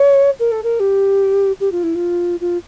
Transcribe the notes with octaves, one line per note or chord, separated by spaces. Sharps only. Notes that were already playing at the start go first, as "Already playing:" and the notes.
Already playing: C#5
A#4
A4
A#4
G4
G4
F4
E4
F4
F4